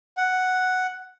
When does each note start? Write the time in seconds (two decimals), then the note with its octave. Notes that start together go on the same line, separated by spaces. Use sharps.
0.17 F#5